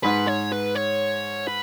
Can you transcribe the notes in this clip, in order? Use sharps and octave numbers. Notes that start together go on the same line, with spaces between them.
G#2 B4
C#5
B4
C#5
B4